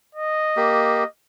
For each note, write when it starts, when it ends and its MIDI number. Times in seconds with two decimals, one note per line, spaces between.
0.15 1.07 75
0.57 1.04 58
0.57 1.04 67